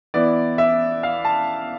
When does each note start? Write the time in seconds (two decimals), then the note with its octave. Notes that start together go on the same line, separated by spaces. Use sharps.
0.14 E3 B3 E4 D5
0.58 E5
1.03 F5
1.25 A5